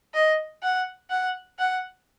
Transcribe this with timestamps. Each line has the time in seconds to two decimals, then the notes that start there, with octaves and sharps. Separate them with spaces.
0.14 D#5
0.63 F#5
1.10 F#5
1.59 F#5